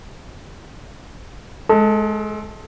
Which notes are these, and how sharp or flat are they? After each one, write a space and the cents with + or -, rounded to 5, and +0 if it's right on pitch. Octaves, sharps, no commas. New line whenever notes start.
G#3 +30 A4 +0